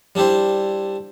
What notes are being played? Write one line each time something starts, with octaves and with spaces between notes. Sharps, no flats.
G3 D4 E4 G4 C5